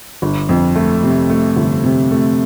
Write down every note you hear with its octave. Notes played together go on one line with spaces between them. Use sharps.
G1
F2
A3
C3
A3
G1
C3
A3